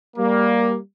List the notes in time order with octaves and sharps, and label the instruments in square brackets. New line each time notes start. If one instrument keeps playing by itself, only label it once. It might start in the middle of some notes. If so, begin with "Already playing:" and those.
[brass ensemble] G3 A#3